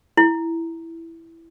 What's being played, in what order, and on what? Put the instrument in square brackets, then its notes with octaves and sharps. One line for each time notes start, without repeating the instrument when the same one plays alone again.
[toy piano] E4